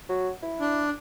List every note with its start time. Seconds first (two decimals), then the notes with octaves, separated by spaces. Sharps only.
0.09 F#3
0.42 E4
0.60 D4